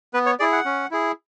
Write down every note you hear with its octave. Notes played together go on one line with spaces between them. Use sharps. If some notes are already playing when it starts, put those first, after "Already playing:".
B3 B4
C#5
E4 G#4 D5
F#5
C#4
E4 G#4